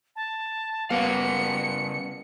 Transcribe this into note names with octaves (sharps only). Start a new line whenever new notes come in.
A5
C#3 G3 B3 A#4 F5 C#7